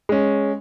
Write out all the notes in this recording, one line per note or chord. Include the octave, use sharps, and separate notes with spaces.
G#3 C#4